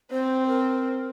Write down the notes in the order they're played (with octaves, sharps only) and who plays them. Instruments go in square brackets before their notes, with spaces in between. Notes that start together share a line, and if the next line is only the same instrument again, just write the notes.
[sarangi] C4 [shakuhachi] C5
[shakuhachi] A#4